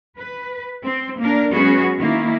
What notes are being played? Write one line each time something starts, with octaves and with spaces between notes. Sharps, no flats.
B4
C4
A#3 D4 A#4
F#3 G#3 B3 C#4 F#4 G#4
D#3 A#3 E4